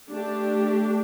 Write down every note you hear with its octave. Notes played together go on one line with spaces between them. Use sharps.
A3 D4 G4